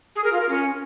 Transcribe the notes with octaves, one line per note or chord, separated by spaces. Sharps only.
G#4
A#4
F4
A#4
C#4